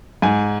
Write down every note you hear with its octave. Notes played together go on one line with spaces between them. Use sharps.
G#2 G#5